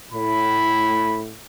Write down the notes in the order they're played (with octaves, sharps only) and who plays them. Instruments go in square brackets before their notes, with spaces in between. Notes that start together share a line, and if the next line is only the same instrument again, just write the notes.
[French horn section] A2 [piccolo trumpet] B5